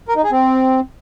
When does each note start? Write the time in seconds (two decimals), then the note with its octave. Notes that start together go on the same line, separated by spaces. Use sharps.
0.08 A#4
0.16 D#4
0.24 G#4
0.31 C4